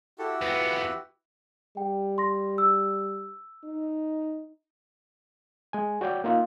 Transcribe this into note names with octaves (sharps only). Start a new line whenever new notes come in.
E4 F#4 G4 A4
F2 B3 B4
G3 G5
C6 A#6
E6
D#4
G#3 G#5
F#4 C#5 D5 G5
A#3 D#4 F4